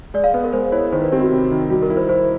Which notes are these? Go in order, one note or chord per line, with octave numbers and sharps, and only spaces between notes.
G#3 D5
F5
B3 B4
A#4
G#3 C5
E4 C#5
D#3 C5
B4
C4 G4
F#4
C3
D#3
G3 F#4
A#4
E4
C5
E4 C5